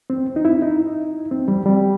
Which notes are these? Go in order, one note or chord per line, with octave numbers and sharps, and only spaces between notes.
C4
D#4
E4
D#4
C4
G3
G3